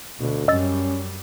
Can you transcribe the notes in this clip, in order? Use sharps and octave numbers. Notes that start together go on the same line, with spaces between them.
D2 B2 D3
F#2 G3 C#4 D#5 E6 A6